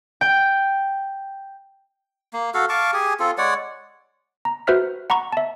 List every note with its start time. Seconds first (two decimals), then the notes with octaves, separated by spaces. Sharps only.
0.21 G5
2.33 A#3
2.54 F#4 A4 F5
2.69 F5 A5 C#6 D6
2.93 G4 G#4 G#5
3.19 C4 F4 A4
3.38 G#3 C#5 D5 F#5
4.45 A#5
4.67 F#4 B4 C5 E5 F6 B6
5.10 F#5 A#5 B5 C#6
5.32 E5 A5